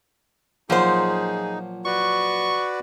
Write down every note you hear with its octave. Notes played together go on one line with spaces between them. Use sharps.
A#2 F3 F#3 D#4 G#4 C5
F#4 B4 D5 C#6